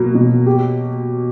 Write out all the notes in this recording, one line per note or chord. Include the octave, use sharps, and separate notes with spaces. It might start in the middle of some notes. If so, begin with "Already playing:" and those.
Already playing: B2 F#3 A#3
B2
G4